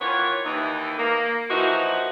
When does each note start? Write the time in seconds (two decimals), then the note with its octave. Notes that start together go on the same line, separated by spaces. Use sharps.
0.01 D#3 E3 B3 F4 C#5
0.46 D#2 E3 D#4
0.98 A#3
1.50 E3 F3 A#3 D#4 E4 F#4